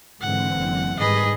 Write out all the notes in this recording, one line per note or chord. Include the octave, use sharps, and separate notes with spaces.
G#2 D3 E3 C4 F#5
F#1
G#2 D#3 G3 G#4 B4 D#5